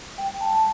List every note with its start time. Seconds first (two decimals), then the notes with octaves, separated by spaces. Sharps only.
0.18 G3 G5
0.41 A5